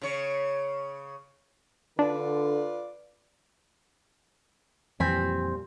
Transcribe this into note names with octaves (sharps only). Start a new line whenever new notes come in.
C#3 C#5
D3 D4 F4 B4 D5
F2 A#2 E3 G3 C4 G#5 B5